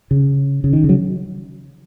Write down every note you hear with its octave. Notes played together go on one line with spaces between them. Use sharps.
C#3
C#3
D#3
C#3
F#3